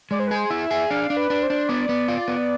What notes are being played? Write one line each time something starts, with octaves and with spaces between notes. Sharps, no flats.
G#3 D5
C5
B4
G#4 C5
E4 E5
G#4
D4 F5
D4
B4
D4
C5
D4
B3 D5
B3
F4
B3